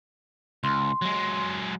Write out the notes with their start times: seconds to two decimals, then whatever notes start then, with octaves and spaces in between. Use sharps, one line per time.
0.64 C#2 C6
1.02 F#3 G#3